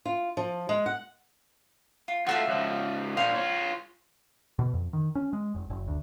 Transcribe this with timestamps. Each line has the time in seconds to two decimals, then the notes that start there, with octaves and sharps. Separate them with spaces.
0.05 F4
0.37 F3
0.69 G#3
0.86 F#5
2.08 F4
2.27 A3 F4 F#4 E5 F5
2.48 C#2 F3
3.17 A#2 C5 F5 G#5 C#6
3.35 F4 C#5
4.59 B2
4.74 F2
4.93 D#3
5.15 C#4
5.33 G#3
5.55 F1
5.70 F#1
5.88 D2